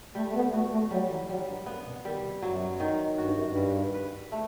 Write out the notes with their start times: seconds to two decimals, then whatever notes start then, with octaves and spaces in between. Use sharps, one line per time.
0.15 G3 A3
0.29 A3
0.35 B3
0.53 A3 F#4
0.72 A3
0.91 F#3 G3
1.10 E3
1.29 F#3 G3
1.48 G2
1.66 F#2 B3
1.86 B2
2.05 D#3 G3
2.24 C3
2.42 F#2 F#3
2.80 D#3
3.18 G2 F#4
3.31 F#2
3.44 G2
3.56 G3
3.94 B4
4.32 A3